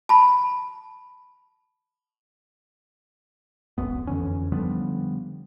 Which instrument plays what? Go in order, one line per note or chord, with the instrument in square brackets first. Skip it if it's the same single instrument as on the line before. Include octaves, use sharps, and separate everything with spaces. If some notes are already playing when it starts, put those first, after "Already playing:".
[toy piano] A5 B5
[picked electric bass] D1 G#1 F#2 B3
F2 D3 E3 C#4
D3 F3 G3 B3